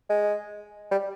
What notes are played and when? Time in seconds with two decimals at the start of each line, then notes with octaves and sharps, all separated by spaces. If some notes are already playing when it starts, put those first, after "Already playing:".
0.10 G#3
0.91 G3